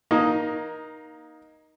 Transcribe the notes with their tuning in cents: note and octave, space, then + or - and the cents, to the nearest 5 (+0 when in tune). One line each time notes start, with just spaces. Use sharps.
A#3 +20 D#4 +0